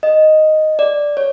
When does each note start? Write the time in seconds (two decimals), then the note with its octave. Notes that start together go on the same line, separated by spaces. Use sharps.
0.03 D#5
0.79 D5
1.17 C#5